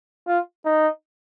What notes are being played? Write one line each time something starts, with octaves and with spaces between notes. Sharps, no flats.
F4
D#4